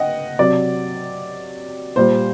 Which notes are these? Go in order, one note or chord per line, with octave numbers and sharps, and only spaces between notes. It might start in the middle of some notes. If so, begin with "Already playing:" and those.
Already playing: D#5 F#5 G5
C3 F#3 D5
A#2 G3 C5